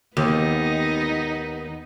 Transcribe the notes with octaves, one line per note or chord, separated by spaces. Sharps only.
D#2 B3 D#4